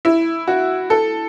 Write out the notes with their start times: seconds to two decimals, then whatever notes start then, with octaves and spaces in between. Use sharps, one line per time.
0.05 E4
0.48 F#4
0.90 A4